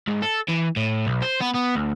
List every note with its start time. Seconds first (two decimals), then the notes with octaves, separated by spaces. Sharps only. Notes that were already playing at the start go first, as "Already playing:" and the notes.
0.08 G#2
0.22 A4
0.49 E3
0.77 A2
1.07 B1
1.22 C5
1.41 B3
1.54 B3
1.75 D2